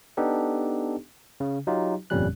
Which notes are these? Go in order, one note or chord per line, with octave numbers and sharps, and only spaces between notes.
B3 D4 D#4 G4 A4
C#3
F#3 D#4 F4 G4
G1 F2 A#2 G3 C#4 F#6